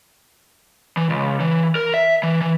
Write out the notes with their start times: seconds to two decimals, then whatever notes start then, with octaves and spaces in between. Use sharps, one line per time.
0.97 E3
1.10 C#2
1.40 E3
1.75 A#4
1.94 E5
2.23 E3
2.41 E3